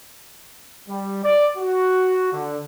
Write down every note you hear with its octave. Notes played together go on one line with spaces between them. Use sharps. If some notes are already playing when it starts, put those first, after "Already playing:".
G3
D5
F#4
D3